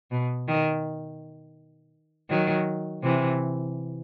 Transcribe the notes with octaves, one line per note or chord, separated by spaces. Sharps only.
B2
D#3
D#3 F#3
C3 E3